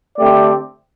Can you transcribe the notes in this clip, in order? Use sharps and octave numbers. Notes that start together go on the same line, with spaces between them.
D3 A3 C4 G4 D5